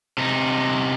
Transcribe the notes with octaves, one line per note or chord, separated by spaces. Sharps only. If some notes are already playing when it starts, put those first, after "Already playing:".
C3 D#4